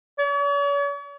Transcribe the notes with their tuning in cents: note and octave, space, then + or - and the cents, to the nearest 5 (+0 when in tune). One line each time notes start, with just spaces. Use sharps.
C#5 +45